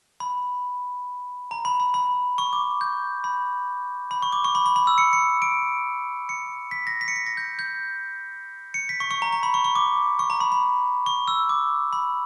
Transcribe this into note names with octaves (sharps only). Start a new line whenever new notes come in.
B5
A#5
B5
B5
B5
C#6
D6
G6
B5
B5
C#6
D6
C#6
B5
B5
B5
E6
C#7
C#7
D7
C#7
B6
A#6
B6
C#7
B6
A#6
G6
G6
C#7
B6
C#6
C#6
A#5
A#5
B5
C#6
C#6
D6
C#6
A#5
B5
B5
C#6
E6
D6
B5